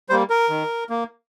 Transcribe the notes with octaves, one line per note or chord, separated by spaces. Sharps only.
G3 A#3 C5
A#4
D#3
A#3